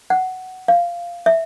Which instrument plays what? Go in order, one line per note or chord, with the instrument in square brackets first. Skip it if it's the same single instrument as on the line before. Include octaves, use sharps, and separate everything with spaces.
[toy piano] F#5
F5
E5